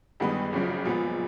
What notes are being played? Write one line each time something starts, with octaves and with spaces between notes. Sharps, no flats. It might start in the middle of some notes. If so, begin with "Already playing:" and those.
G1 G2 D#3 G#3 B3
F#1 F#2 C#3 F3
A#2 F3 G#3 B3